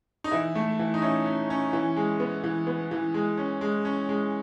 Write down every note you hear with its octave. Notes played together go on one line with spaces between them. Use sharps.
D#4
E3 E4
A3
E3
D#4
C#4 E4
C#4
C#4
E3
G#3
B3
E3
B3
E3
G#3
C#4
G#3
C#4
G#3